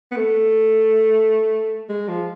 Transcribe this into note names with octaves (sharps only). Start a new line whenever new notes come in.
B3
A3
G#3
F3